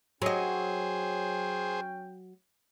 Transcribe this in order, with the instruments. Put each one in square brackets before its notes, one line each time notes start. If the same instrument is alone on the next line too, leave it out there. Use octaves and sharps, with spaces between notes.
[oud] F#3 D#5 [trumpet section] C#4 G5 [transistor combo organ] G#4 C5